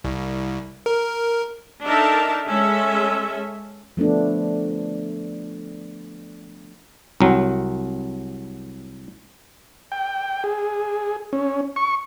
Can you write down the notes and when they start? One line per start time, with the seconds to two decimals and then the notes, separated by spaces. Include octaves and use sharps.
0.04 C2
0.86 A#4
1.83 D4 D#4 A4 A#4 E5 A5
2.48 G#3 C#4 A4 E5
3.97 F3 A3 B3 D4
7.21 C2 F#3
9.92 G5
10.44 G#4
11.33 C#4
11.76 C#6